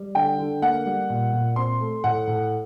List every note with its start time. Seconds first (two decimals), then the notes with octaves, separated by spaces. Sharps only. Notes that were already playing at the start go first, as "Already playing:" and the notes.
Already playing: G3
0.15 D3 G5
0.39 D3
0.62 A#3 F#5
0.86 G3
1.10 A#2
1.33 A#2
1.56 C4 C6
1.80 A3
2.04 A2 F#5
2.27 A2